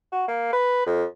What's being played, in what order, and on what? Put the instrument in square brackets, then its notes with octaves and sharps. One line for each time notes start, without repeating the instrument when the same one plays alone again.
[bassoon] F#4
A#3
B4
F2